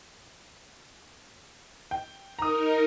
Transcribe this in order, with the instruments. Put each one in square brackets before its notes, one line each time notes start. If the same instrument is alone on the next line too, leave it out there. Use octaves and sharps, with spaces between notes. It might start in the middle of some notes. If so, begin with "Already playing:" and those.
[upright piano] G5
[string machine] D#4 A#4 [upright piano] A#5 D#6